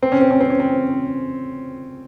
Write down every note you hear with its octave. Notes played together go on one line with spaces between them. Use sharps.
C4
C#4
C4
C#4
C4
C#4
C4